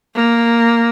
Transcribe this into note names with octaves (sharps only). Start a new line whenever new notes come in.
A#3